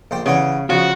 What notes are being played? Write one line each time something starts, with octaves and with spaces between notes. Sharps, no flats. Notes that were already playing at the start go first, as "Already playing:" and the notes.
A#1 C5 G5
C#3 E3 F#4 C#5
C#3 F3 F#4